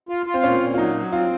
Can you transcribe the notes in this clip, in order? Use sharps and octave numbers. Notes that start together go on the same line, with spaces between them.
F4
F4
C4
A#2 C#4
A#2
F4
F#3 D#4
F#3
C4 F4